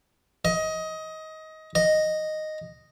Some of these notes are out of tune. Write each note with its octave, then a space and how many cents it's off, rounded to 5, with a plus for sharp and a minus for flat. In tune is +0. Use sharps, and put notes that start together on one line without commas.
D#5 +20
D#5 -5